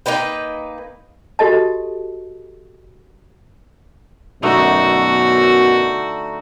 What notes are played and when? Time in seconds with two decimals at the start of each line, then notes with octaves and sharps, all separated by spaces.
0.06 A#3 D#4 B4 G5
1.39 F#4 G4 A4 D#5 A5
4.43 F#2 B2 D3 A3 D#4 F#4